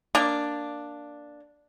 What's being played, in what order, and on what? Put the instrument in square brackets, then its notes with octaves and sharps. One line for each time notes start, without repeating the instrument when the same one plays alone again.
[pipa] A#3 D4